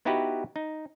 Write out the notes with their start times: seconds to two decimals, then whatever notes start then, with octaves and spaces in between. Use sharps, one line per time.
0.05 B3 D#4 E4 F#4 G4 B4
0.56 D#4